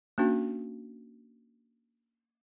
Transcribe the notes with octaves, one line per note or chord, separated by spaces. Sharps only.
A#3 C#4 D4 F#4